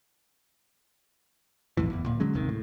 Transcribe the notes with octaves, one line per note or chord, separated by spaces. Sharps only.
B1 F2 A2 E3
F#1 E2
D1 A#2
D3 F#3 G#3 C#4
D#1 G#1 C3 D#3
A2